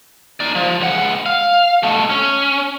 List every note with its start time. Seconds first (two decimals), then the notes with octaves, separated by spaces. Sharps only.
0.40 D#4 D5
0.55 F3
0.81 C#2 F#5
1.26 F5
1.83 B2 A3
2.10 C#4